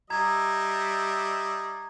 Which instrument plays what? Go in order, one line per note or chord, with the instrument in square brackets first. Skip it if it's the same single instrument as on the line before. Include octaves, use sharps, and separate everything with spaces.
[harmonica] G3 D#5 E5 [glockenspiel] A#5 G#6